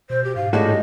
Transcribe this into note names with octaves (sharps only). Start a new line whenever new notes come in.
B2 C5
G4
G#2 F5
A2 G3 G#3 D4 F#4 D#5